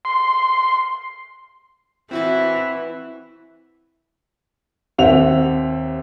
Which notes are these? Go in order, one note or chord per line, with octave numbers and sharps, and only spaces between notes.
C6
E3 C4 E4 F#4 B4
D#2 C4 E5 F#5 F7